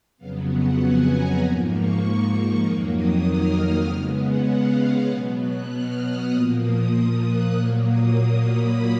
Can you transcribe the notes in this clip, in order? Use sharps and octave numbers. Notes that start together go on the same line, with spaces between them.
F2 C#3 F#3 B3 F5
F#5
G#5
A#5
G#2 F3 A#3 B5
C#6
F2 D#3 F#3 A#3 D#6
D#6
F6
F6
C#3 G#3 B3 F6
F#5
F5
F#5
B2 F#3 B3 G#5
F#6
F6
D#6
A#2 F3 A#3 D#6
D#6
D#6
F#6
A#2 F#3 A#3 F6
D#6
D#6
B5